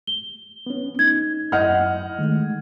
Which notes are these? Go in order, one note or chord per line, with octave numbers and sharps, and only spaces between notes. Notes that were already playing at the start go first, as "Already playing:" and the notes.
G7
B3 C#4
D#4 G#6
F#2 E4 D#5 F#5 F6 G6
D#3 G#3 A3